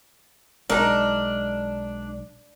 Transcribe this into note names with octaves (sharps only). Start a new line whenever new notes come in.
B1 G#3 D4 D#4 A#4